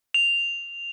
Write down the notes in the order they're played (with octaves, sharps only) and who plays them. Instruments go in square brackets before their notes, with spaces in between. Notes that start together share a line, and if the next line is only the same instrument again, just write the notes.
[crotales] F7